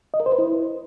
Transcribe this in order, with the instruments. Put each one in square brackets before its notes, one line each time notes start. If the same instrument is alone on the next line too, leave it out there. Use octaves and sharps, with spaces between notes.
[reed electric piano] D#5
A#4
C5
B4
E4